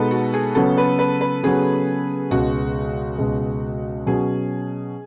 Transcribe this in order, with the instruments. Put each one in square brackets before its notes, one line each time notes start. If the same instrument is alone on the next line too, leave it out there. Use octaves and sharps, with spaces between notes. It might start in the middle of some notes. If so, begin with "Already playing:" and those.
Already playing: [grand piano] B2 G#3 B3 D#4 [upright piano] A4 B4
[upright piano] F#4
G#4
[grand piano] C#3 F#3 B3 [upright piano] A4
[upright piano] B4
B4
B4
[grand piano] C#3 F#3 B3 [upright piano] G#4
[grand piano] C#2 B2 G#3 [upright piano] F#4
[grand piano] C#2 B2 G#3
[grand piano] B2 F#3 C#4 [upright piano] G#4